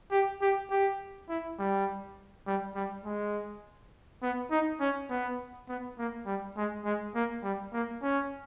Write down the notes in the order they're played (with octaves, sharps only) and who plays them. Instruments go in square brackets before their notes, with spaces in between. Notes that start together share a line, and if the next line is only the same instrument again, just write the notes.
[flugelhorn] G4
G4
G4
E4
G3
G3
G3
G#3
B3
D#4
C#4
B3
B3
A#3
G3
G#3
G#3
A#3
G3
A#3
C#4